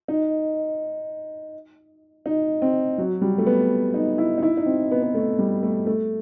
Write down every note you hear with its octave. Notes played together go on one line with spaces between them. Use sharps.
D#4
D#4
C4
F#3
G3
A3
B3
D#4
E4
D#4
E4
D#4
C4
B3
B3
A3
G3
A3
A3